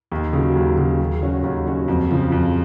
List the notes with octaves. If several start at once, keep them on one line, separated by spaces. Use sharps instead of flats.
D#2
C#3 F#3
D#2
C#3 F#3
D#2
C#3 F#3 C#4 F#4
D#2
C#3 F#3 C#4 F#4
F2
C#3 F3
F2